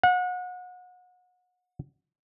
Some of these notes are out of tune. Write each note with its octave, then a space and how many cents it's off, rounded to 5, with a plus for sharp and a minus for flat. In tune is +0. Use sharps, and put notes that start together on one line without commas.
F#5 -30